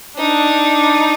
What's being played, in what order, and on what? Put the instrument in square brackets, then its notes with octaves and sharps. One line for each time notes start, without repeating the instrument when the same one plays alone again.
[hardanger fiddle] D4 [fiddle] D#4